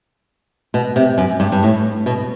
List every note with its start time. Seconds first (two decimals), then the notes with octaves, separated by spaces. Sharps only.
0.74 B2
0.96 C3
1.18 F#2
1.40 G2
1.52 G2
1.63 A2
2.06 B2